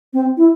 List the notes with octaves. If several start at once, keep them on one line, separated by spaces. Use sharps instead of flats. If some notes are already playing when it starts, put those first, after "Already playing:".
C4
E4